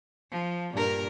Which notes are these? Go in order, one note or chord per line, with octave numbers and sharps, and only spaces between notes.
F3
G2 A#2 A#4